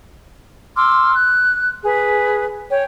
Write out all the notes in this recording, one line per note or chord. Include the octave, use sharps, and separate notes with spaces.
C6 D6 E6 F6
F#6
G#4 B4
C#5 G5